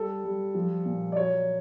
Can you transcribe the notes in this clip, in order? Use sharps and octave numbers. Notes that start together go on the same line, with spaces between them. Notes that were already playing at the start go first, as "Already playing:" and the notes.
Already playing: G3 A4
G3
F3
A#2
D5
F#3 C#5